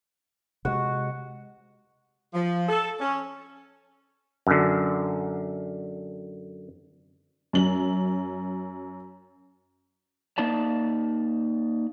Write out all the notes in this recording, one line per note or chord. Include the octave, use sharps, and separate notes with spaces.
C3 G#3 F#4
F3
A4
C#4
F#2 D3
F#2 F#7
A#3 D#4 D5 A5